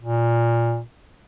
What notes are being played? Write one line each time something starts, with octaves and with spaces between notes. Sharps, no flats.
A#2